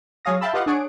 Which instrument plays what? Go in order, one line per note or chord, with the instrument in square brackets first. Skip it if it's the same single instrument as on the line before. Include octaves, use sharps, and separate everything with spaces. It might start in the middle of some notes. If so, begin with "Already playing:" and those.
[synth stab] F#3 G#4 C#5 F5 D#6 A#6
E5 F5 G5 A5 B5 E6
F4 G4 B4 D#5 F5 F#5
D4 G#4 C#5 F#5 D7